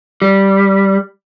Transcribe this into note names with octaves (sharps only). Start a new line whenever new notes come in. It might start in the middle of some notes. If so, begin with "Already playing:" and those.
G3